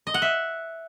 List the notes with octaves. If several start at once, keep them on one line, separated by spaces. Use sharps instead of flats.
D#5
F#5
E5